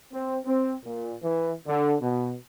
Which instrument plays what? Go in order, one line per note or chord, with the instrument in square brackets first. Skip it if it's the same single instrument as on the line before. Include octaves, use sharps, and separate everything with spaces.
[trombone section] C4
C4
A#2
E3
D3
B2